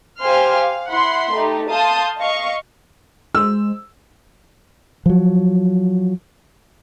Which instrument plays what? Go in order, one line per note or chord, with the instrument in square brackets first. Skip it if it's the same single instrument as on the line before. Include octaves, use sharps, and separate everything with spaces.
[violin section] G4 C5 F5 G#5 C6 F6
F5
E4 F#5 B5 C6
A3 D#4 G4
F5 A5 C6 D#6 G6
D#5 F5 C#6
[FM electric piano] G#3 C5 [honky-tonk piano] E6
[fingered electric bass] F3 F#3